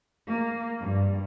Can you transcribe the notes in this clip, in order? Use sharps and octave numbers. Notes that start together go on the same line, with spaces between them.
A#3
G2